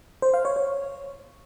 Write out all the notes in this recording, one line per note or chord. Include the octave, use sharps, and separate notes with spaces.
C5
F5
C#5
C#5